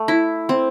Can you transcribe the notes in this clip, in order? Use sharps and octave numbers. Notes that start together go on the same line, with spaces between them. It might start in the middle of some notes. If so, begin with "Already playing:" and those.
Already playing: A3
E4
C4